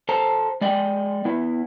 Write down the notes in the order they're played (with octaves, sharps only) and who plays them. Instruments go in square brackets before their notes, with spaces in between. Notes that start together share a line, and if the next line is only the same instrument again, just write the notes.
[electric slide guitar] A4 C5 A5 A#5
G#3 D5 D#5 G5
B3 E4